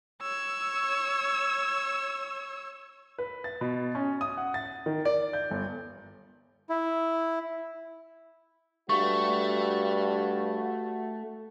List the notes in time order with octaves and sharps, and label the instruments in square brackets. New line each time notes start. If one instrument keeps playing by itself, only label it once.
[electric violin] C#5 E6
[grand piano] B4
A6
B2
C#4
D#6
F#5
A6
D#3
D5
G6
G1
[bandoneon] E4
[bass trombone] G2 [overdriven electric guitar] A3 [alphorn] F#4 [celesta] C#6